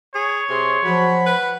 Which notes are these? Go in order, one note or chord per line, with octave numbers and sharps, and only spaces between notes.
G#4 C#5
C3 G#4 C6
F3 F#3 F#5 B5
B4